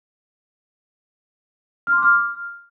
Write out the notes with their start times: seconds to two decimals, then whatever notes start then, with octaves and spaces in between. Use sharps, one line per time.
1.87 F6
1.92 C6
1.98 D6
2.03 F6